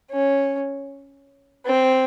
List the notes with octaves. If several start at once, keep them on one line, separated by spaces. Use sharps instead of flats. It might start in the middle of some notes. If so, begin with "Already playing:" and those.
C#4
C4